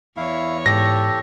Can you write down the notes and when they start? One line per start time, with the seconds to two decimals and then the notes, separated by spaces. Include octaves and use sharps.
0.17 E2 E4 C#5 F5
0.66 G#2 G4 A4 A#6